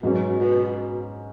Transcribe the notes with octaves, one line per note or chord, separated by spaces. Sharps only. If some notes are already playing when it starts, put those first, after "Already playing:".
G#2 B2 F#3 C#4
B2